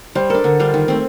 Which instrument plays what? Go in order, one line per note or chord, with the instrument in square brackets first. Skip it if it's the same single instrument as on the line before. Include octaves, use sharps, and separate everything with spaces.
[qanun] G3 [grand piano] C5
[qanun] D4 A4 [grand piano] A#4
[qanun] D3 [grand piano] A#4
[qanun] G3 D4 F4
D#3
A3 C4